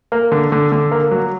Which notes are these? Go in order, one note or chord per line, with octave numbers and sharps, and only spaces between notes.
A#3
D3
D3
D3
A#3
F#3